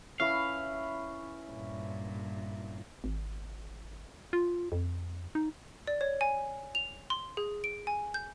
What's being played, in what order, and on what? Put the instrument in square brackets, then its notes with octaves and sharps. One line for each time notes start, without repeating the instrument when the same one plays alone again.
[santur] C#4 E4 B4 [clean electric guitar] F5
[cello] G2 A#2
[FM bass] G#1
F4
F2
D#4
[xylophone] D5
C#5
G#5
F7
C6
G#4
D7
G#5
G6